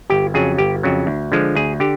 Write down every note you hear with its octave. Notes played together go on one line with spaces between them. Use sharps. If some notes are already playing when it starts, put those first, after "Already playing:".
G1 G4
F2 C#3 F#3 G#4
G1 G4
F2 C#3 F#3
D2
D3 F3 G#3
D2 G#4
D3 G4